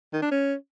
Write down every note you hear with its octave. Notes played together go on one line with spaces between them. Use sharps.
D#3
D4
C#4